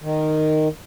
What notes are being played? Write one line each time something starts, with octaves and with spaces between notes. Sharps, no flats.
D#3